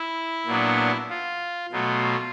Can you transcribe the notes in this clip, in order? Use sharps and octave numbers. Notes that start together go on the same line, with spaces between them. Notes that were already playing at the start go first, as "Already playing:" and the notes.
Already playing: E4
A#2 F#3 B3 D4
F4
B2 F#3 A3 F4